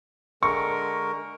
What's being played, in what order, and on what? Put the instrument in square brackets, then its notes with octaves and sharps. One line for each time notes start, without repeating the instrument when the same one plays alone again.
[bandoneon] D3 G#3 A#4 [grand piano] C#6